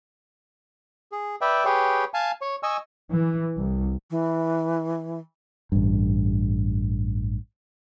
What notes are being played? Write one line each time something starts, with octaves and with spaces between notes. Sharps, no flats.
G#4
B4 D5 E5 G5
G4 G#4 B4 C#5 G5
F5 G#5 A5
C#5
D#5 G#5 C#6 E6
E3
C2
E3
A1 G2